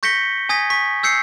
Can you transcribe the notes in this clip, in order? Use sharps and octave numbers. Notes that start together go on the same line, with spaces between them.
C#6 G6 A#6 B6 C#7 G7
G#5 D#6 G#6 A#6 B6
C#6 B6
E6 G6 C7 C#7